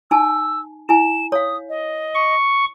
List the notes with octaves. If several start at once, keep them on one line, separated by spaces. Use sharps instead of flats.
D#4 G#5 A5 E6
E4 G#5 E7
C#5 F5 D#6
D#5
C#6